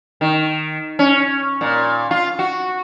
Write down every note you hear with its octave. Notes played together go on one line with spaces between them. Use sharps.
D#3
C#4
A#2
F4
F#4